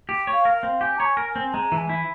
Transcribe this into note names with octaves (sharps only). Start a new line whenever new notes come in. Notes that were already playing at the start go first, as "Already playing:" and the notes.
G4
C#5
F5
A#4
F5
C4
G4 G#5
C#5 A#5
G#5
A#4
G#5
C4
G#3 A#5
E3
G#5
E4